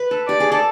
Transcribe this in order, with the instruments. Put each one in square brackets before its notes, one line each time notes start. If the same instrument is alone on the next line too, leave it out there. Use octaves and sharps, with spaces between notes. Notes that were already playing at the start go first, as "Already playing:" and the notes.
Already playing: [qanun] B4
A4
[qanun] G4 [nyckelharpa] D5
[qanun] G#4
A4